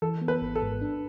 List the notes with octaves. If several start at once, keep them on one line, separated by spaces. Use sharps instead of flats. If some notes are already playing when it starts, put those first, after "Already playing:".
E3 A4
B3
B4
G#1
A4
G#2
D4